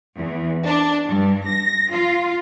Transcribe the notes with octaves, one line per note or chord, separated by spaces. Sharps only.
E2
D4
G2
A#6
F4